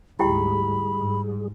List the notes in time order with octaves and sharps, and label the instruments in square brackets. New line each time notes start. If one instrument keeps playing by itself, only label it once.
[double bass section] D2 G#2 [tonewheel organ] G3 G#4 [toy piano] E4 G4 G5 [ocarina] B5
[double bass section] G#2